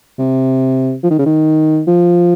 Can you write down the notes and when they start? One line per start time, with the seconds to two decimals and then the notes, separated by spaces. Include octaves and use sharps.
0.19 C3
1.03 F3
1.10 D#3
1.19 C#3
1.26 D#3
1.88 F3